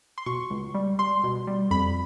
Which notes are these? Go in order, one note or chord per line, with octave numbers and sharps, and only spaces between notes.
C6
B2 C#6
C#2
G3
G3 C6
B2
G3
F2 B5